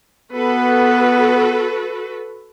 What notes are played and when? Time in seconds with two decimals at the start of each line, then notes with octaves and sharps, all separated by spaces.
0.33 B3 F#4 A4 B4